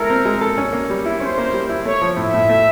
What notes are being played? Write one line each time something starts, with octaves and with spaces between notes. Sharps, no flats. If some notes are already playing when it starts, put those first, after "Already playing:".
Already playing: G#3 E4 A4 A#4
C4
G#3
A4
C#4
A#3
G3
E4
C#4 C5
A#3
G3
E4
A3 C#5
F3
A2 E5
A2
A3